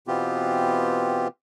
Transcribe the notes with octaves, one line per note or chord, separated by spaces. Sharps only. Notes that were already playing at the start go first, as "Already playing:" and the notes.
B2 E3 B3 C4 F4 G4